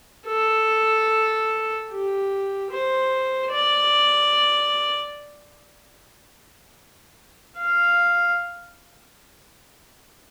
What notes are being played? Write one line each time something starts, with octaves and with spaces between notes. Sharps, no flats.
A4
G4
C5
D5
F5